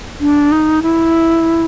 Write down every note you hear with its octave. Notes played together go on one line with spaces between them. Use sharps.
D4
D#4
E4